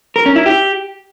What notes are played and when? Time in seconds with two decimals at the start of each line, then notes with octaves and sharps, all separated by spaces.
0.16 A#4
0.26 C#4
0.36 E4
0.46 G4